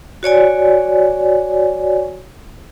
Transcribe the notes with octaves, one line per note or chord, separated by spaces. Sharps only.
F#4 C#5 D5 G#5